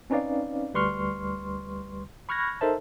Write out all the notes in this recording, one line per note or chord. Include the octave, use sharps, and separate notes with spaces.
C4 C#4 D#4 B4 D5 F5
D2 G3 B4 C6 C#6 F6
B5 C#6 F6 F#6 G#6 A#6
D#4 A4 A#4 C5 E5 A5